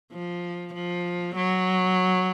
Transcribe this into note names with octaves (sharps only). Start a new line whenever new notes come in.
F3
F3
F#3